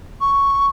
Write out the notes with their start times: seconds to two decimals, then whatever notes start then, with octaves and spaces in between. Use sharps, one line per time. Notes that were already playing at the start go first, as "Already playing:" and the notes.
0.21 C#6